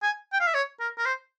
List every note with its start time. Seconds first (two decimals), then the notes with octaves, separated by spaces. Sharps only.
0.03 G#5
0.33 G5
0.40 F5
0.47 E5
0.54 C#5
0.80 A#4
0.98 A#4
1.05 C5